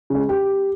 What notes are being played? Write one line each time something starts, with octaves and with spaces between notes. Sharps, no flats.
C#3 G#3
G4